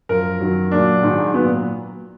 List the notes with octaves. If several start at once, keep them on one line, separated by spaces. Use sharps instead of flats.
F#2 F3 A#4
F#2 D#3 F#3
A#2 F#3 D4
G#2 D#3 F#3
A#2 F#3 B3